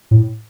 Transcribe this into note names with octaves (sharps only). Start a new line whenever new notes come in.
A2